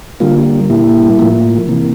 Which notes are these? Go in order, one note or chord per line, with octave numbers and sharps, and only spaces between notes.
D3 G3 A#3 F4
A#2 G3 A#3 E4
A2 F3 A#3
C3 E3 A#3